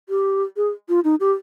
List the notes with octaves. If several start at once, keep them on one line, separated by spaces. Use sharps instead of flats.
G4
G#4
F4
D#4
G4